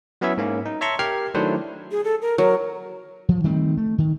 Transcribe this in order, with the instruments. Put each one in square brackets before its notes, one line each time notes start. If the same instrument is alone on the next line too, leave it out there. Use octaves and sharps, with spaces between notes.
[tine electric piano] F#3 B3 C#4 E4 C#5 E5
G#2 A#3 C#4
D#4
C#5 E5 A5 A#5 C6 C#6
G4 A#4 G5 F6 G#6 C7
D#3 F#3 A3 D4 E4 C5
[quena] G#4
A4
A#4
[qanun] F#3 [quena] A#4
[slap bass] F3
D#3 G3 A3 C4
A3
D#3